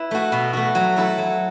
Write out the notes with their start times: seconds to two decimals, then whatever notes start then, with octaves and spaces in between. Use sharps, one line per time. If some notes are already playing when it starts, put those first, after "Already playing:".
Already playing: E4 B4
0.11 A3 F#4
0.32 B2
0.53 A3 F#4
0.75 F#3
0.96 A3 E4 A4
1.18 F#3